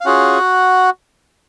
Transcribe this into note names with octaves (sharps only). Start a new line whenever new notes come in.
F5
C#4 F4 F#4 G#4 F#5